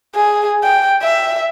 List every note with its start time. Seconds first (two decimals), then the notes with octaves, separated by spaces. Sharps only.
0.15 G#4
0.64 G5
1.03 E5